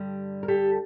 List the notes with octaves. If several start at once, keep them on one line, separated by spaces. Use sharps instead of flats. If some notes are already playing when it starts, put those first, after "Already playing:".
Already playing: G2 D3 G3
A#4
G4 A4